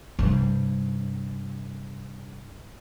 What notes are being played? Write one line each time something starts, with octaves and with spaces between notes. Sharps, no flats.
G2 C3